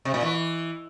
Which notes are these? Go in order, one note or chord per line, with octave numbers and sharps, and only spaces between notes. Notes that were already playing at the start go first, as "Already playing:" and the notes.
C3
A#2
E3